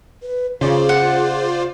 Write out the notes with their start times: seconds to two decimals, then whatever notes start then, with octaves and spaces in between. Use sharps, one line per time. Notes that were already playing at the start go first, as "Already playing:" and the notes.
0.22 B4
0.61 C#3 F4 G#4 C5 D5
0.89 F#5